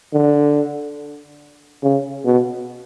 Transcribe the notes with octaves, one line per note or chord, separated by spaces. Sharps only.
D3
C#3
B2